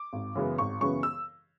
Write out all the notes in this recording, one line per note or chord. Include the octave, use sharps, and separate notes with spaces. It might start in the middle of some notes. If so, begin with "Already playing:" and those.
Already playing: D6
G#1
F#2 C#3 E3 B3
G#1 C#6
F#2 C#3 E3 B3 C#6
E6